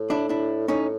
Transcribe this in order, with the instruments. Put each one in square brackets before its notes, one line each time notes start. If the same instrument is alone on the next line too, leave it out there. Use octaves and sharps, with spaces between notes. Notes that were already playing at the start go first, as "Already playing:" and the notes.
Already playing: [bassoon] A2
[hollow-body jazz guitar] D4 E4
D4 E4
[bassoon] A2 [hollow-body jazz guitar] C#4 D#4